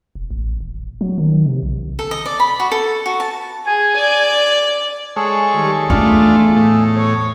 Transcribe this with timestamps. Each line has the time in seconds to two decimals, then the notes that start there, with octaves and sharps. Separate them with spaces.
0.15 E1
0.31 A1
0.61 D#1
1.01 F#3
1.18 D#3
1.46 C3
1.63 B1
1.99 A4
2.11 D#5
2.26 D5
2.40 B5
2.60 F#4
2.71 A4
3.06 F#4
3.20 A5
3.65 G#4 G#5
3.96 D5
5.16 G#3 G#4 A4 C#5 A5
5.53 D#3 G3
5.90 E2 A3 D4 F4
6.56 A2
6.96 C#5